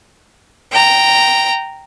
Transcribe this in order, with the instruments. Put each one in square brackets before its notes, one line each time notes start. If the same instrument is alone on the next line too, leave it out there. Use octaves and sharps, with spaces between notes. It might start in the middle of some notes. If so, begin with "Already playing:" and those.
[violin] G5 A#5